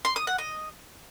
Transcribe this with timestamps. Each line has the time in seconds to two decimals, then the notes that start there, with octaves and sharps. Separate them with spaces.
0.05 C6
0.16 D#6
0.27 F#5
0.38 D#5